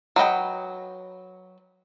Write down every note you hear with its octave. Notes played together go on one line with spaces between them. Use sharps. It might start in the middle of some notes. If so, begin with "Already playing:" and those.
F#3 B4 D#5 G5